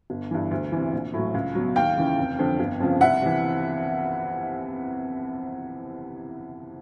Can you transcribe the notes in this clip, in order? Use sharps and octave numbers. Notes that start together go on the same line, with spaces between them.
G1
G2 E3
D2
C3 E3
A#1
A2 F#3
C#2
B2 F#3
D#2 F5 G5
C#3 E3
F1
F2 D3 F3
G1
F2 C#3 F3
C2 E5 F#5
C3 E3